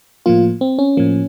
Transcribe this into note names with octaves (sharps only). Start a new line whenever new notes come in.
A2 F3 A#3 F4
C4
C#4
A2 F3 A#3